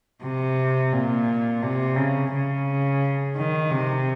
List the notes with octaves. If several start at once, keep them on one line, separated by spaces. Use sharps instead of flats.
C3
A#2
C3
C#3
C#3
D#3
C3